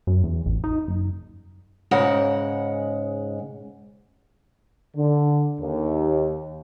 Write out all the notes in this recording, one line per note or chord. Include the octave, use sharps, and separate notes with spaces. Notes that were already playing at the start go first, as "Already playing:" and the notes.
F#2
E2
A1
D#4
F#1
G#2 C#3 G#3 F#5
D3
D#2